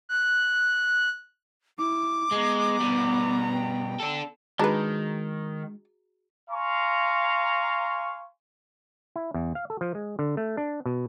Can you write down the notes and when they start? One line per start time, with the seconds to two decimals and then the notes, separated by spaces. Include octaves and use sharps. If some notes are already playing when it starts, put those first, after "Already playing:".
0.09 F#6
1.79 E4 D6
2.32 G#3 B3 A#5
2.80 B2 G3
3.53 G5
4.00 D4 A4
4.59 D#3 G#3 D4 F#4 G#4 B4 A#5
6.50 F5 G#5 A#5 C6 C#6
9.16 E4
9.34 E2
9.55 F5
9.70 A4
9.81 F3
9.95 G#3
10.19 D3
10.37 A3
10.57 D4
10.86 B2